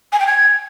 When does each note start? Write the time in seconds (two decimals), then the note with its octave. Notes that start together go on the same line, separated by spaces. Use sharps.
0.12 G#5
0.19 G5
0.26 G#6